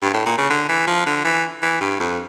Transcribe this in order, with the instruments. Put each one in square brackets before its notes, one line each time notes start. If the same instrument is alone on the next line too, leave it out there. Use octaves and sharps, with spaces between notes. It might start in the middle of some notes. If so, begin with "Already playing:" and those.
[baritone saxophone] G2
A2
A#2
C#3
D3
E3
F3
D3
E3
E3
G2
F2